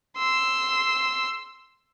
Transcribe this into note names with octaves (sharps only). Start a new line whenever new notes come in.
C6 E6